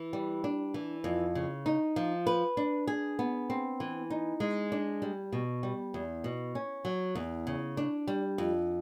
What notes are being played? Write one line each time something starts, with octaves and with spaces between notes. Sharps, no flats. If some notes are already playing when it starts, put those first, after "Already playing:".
Already playing: E3
G3
D4
E3
F2
C#3
D#4
F3
B4
D4
G#4
B3
C4
E3
D#4
G#3
D4
G3
B2
G3
E2
B2
C#4
F#3
E2
C#3
D4
G3
F2